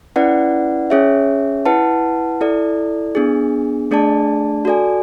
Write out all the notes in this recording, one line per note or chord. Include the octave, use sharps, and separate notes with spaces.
C#4 E4 B4 D5 F#5
C#4 G#4 C#5 E5
E4 B4 F#5 A5
E4 A4 D5
B3 D4 G#4
A3 D4 G#4 D5 A5
F#4 A4 D5 G#5